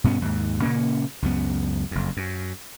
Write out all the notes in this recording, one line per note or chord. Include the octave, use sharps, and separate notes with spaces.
G2 B2 B3 C#4
D#2 G#2
A#2 C#3 A#3 C#4
C#2 F#2 B3
F#1 F2
F#2